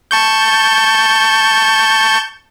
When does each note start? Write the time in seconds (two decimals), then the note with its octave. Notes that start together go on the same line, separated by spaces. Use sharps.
0.11 A5 C#6 G6